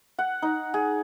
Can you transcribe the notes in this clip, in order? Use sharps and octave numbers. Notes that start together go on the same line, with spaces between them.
F#5
D#4
G#4